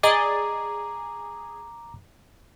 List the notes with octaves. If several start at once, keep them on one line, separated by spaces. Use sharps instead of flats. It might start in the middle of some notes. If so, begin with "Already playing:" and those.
G#4 D5 D#5 A#5 D6 A6